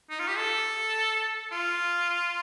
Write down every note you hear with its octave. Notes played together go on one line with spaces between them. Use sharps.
D#4
F4
G4
A4
F4